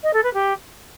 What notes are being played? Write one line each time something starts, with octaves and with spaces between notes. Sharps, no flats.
D#5
A4
B4
G4